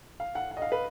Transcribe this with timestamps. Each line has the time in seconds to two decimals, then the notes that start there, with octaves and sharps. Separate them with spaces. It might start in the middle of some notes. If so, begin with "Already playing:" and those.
0.20 F5
0.35 F#5
0.51 F#5
0.57 D#5
0.62 F5
0.72 B4